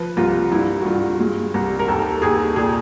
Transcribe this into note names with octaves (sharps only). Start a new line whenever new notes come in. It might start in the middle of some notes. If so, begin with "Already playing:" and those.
Already playing: F3 B4
C2 F4
G2 E4
F#4
G2 F4
G#3
C2
A#4
D#2 A4
D#2 G#4
A#2 G#4